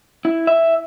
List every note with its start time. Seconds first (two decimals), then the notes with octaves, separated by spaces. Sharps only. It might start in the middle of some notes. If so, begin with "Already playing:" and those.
0.25 E4
0.47 E5